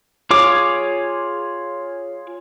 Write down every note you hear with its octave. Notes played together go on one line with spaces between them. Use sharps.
F4 G#4 C#5 D6